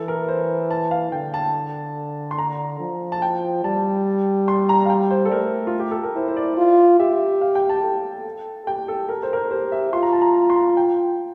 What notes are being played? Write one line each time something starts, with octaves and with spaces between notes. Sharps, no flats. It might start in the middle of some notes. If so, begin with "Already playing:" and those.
Already playing: E3 A4
A#4
C5
A5
F5
D3 G5
A5
C6
A#5
F3
A5
G5
G3 A5
C6
A#5
F5
G5
C5
A4
A3 A#4
F4
G4
A4
A#4
E4 C5
C5
D5
F4
G4 E5
F5
G5
A5
A4
G4 G5
A4
A4 A#4
C5
A#4
C5
G4 C5
E5
F4 C6
A#5
A5
A#5
C6
A#5
G5